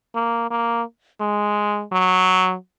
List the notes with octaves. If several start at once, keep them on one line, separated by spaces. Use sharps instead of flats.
A#3
A#3
G#3
F#3